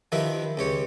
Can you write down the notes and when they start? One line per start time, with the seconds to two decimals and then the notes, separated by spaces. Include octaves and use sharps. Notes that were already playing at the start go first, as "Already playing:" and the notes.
0.12 D#3 F3 E4 G4 B4
0.57 C#2 G4 C#5